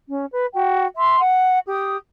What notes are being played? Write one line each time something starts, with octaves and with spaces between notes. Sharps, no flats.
C#4
B4
F#4 G5
E5 C6
F#5
G4 D#6